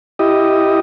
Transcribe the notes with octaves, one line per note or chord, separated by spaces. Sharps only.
E4 G4 D#5